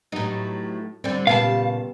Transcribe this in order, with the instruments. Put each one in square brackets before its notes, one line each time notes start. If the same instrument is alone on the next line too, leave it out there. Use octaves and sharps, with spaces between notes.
[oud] A2 D#4 [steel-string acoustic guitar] F#3 B3 G4
[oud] D3 G3 [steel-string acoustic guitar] C4
[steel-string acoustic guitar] A#2 C#3 A5 [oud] B3 C4 G4 [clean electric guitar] F5